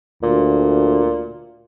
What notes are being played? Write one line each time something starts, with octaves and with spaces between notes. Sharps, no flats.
D2 A#2